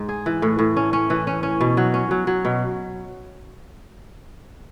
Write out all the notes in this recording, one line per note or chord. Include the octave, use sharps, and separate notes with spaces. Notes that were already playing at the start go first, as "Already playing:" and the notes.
Already playing: G#2
G#4
E3
A2
A2
C#4
C#4
E3
C#4
C#4
B2
F#3
C#4
F#3
F#3
B2